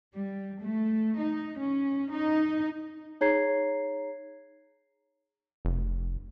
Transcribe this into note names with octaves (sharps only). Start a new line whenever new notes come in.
G3
A3
D#4
C#4
D#4
D#4 G#4 C#5 A#5 G#6 C7
F1